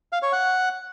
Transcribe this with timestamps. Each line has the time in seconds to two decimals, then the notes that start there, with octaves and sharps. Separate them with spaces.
0.13 F5
0.23 C#5
0.33 F#5